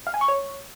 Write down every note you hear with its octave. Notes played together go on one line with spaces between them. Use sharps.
F5
G#5
C#6
C#5